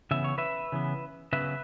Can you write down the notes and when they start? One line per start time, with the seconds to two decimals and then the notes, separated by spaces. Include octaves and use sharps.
0.11 C#3 E3 B3 E5
0.24 C#5
0.38 B4 E5
0.72 C#3 E3 B3
1.33 C#3 F#3 B3 B4 E5